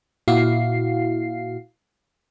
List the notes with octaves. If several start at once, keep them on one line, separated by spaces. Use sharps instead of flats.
A#2 E4 F#4 F5 C7